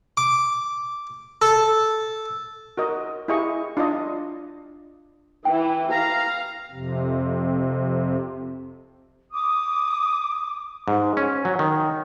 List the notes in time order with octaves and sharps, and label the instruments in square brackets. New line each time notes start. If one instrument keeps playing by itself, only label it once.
[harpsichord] D6
A4
[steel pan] F#4 A#4 D#5
E4 G4 G#4 D#5 F5 C#6
D4 F4 D5 D#5
[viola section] E3 [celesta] G5
[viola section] F5 [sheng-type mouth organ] A#5
[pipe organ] F2 C3
[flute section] D6 D#6
[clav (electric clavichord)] G#2
C#4
F#3
D#3